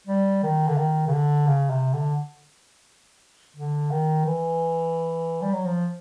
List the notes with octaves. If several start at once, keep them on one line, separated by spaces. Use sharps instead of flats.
G3
D#3
D3
D#3
C#3
D3
C#3
C3
D3
D3
D#3
E3
G3
F#3
F3